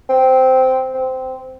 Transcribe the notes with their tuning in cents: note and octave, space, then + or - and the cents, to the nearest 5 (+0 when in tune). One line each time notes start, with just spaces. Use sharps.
C4 -10
C4 -15